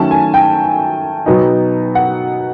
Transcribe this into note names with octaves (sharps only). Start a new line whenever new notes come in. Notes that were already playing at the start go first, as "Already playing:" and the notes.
Already playing: D#3 F#3 A3 C#4 A5
G#5
G5
B2 F#3 B3 D#4
F#5